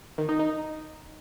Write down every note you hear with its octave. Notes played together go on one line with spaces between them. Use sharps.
D#3
D#4
D#4